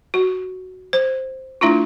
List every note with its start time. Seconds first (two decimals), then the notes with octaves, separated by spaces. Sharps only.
0.14 F#4
0.93 C5
1.61 A3 D4 E4 F4